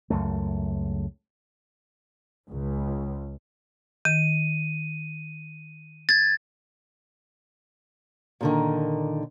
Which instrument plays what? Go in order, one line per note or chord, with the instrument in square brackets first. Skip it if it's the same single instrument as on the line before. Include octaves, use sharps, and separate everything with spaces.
[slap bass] C#2 F#2 A3
[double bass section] C#2
[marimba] D#3 [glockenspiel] D#7
[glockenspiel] G#6 A6
[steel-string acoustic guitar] A#2 D3 D#3